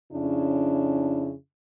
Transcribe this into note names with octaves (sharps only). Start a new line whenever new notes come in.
F2 C#3 C#4 D4 E4